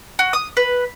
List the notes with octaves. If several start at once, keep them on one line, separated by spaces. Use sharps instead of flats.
F#4
D#6
B4